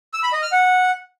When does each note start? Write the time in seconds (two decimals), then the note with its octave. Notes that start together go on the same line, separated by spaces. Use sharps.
0.14 E6
0.23 B5
0.33 D#5
0.42 F6
0.52 F#5